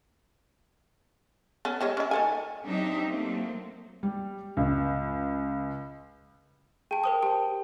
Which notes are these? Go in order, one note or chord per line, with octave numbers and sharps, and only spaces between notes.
B3 C#4 A4
G3 G#3 C#5
C#4 E5
D#3 A4 G#5
F#3 C4 D4 D#4 G4 E5
F#3 A3 A#3 C4
G3
C#2
G#4 G5 A5
A#4 C5 D#6
G4 A5